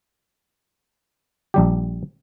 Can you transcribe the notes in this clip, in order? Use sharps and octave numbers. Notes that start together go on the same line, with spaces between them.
A#1 G3 G4